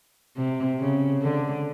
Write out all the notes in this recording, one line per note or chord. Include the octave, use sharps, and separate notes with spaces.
C3
C#3
D3